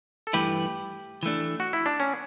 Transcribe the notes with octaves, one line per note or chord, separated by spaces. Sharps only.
A4
G2 E3 A3 E4 G4 B4
E3 A3 D4
F#4
E4
D4
C#4